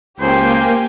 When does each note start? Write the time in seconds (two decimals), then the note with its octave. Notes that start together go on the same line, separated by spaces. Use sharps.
0.20 C#2 A#3 G4 C5 G5 G#5